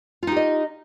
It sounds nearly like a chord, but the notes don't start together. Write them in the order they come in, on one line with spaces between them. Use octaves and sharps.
F4 D#4 G4 D#5